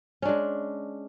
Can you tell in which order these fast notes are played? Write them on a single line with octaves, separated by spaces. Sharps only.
C#4 D4 G#3